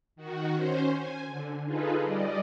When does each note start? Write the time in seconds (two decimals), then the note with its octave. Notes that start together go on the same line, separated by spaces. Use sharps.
0.16 D#3 F#4
0.55 C#4 C5
0.96 G#5
1.27 D3
1.64 D#4 F4 G#4 A4 B4
2.00 G3 D5 D#5